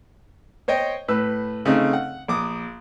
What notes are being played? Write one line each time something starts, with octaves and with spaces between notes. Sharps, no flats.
C5 C#5 D#5 G5
A2 B4 E6
C#3 A3 C4 D#4
F#5
A#1 D6 D#6